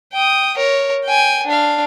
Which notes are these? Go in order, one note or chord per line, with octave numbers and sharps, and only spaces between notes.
G5 D#6
A#4 C#5
G5 G#5
D4 F5